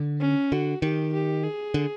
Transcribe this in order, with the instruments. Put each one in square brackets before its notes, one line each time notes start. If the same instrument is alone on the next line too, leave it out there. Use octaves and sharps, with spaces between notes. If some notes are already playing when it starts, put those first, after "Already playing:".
Already playing: [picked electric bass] D3
[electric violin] C#4
[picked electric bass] D3 [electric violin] F#4
[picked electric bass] D#3 [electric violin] G4
[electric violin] G4
G#4
[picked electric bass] D3